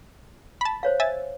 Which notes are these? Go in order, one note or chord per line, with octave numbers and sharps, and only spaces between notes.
A5 B5
C5 C#5 F5
E5 G#5 A6